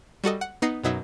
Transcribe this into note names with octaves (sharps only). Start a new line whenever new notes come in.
G3 F#4 A4 D#5
F#5
B3 D#4 D#6 A#6 C7 C#7
F#2 B2 F#3 D#4 E5